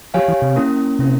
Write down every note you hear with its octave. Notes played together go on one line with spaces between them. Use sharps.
F3 G4 C#5 F5 G#5
E3
C3
A#3 C#4 E4 A#4
C3 A#3 C#4 E4 A#4